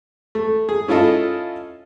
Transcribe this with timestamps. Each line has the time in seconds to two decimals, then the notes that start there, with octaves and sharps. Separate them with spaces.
0.35 A3
0.69 G#4
0.88 C#4 E4 F4 A4 D#5